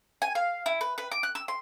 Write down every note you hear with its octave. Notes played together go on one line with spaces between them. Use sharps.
G#5
F5
E4
B4
B4
D6
F#6
E6
C6